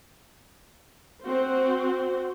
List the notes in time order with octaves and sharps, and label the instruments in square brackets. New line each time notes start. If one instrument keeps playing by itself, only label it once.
[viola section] C4 F#4 C5